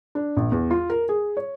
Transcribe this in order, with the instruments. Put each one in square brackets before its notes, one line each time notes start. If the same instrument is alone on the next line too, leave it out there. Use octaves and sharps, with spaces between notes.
[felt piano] D4
A#1
E2
F4
A#4
G#4
C#5